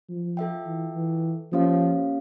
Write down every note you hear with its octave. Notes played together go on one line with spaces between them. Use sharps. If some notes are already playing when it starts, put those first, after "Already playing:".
F3
F4 A4 E5 G5
E3
E3
F3 A#3 C#4 G4 C#5 F5